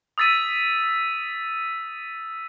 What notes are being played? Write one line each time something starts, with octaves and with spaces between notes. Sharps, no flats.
D#6 E6 A6 B6 D#7